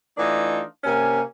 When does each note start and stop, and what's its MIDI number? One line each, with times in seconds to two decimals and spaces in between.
0.17 0.62 52
0.17 0.62 57
0.17 0.62 62
0.17 0.62 63
0.17 0.62 65
0.84 1.21 48
0.84 1.21 58
0.84 1.21 61
0.84 1.21 80